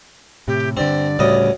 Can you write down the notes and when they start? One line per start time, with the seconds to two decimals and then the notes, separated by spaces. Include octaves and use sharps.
0.48 A2 C3 G4
0.77 G2 D3 C4 D5
1.19 D2 A2 C#3 G3 C#5 D#5